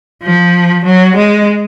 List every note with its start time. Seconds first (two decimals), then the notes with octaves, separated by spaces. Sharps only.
0.23 F3
0.85 F#3
1.17 G#3